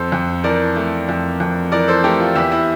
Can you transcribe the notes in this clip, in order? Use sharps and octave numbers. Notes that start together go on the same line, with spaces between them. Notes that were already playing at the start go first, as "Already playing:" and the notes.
Already playing: F2 A4 C5
F2
E3 A#4 D5
A3
F2
F2
E3 A#4 D5
A4 C5
A3 G4 A#4
F4
E2 E4 G4
E4